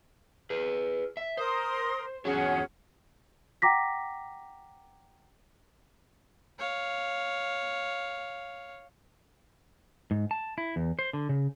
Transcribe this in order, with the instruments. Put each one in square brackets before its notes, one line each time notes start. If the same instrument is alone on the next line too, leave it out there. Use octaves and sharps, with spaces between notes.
[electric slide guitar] G#4 B4
E5
[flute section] A#4 C6 D#6 [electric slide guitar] C5
[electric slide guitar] E2 F#4 C#5 [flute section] C#4 G#4 F#5
[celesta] F#5 G5 A#5 D6 A#6 B6
[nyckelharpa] C#5 F5
[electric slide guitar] G#2
A5
E4
E2
C5
D3
C#3